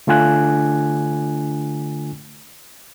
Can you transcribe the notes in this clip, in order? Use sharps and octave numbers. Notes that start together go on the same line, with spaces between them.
D3 A3 D4 F4 G#5 F#6